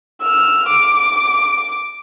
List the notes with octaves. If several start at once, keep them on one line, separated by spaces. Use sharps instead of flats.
E6 F6
D6